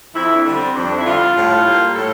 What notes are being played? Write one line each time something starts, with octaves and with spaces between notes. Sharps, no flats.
F2 E4
D4
D3 G3
C4
F2 D4
E4
D3 G3 F4
A2
G3 A#3
A2 A4